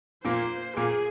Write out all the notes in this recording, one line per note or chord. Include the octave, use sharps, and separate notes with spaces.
A#2 A#3 C5
A#2 A#3 G#4